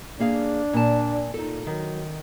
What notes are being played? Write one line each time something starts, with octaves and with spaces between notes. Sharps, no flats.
A#3 D4 G#4 F5
A#2 A5
A#2 D#4 A4
D#3 F#3